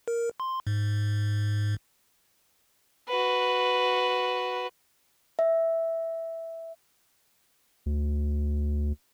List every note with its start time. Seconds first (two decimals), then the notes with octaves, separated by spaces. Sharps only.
0.08 A#4
0.40 C6
0.67 G#2
3.08 F#4 B4
5.39 E5
7.86 D2